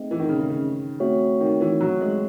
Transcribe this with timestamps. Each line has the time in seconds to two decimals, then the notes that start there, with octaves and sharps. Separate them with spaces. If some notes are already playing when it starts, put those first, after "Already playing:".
Already playing: A3 C4 D#4 G#4 D#5
0.11 E3
0.19 D#3
0.29 C#3
0.39 C#3
0.49 C#3
1.00 A3 C4 F#4 C#5
1.40 D#3
1.61 E3
1.81 F#3
2.01 G#3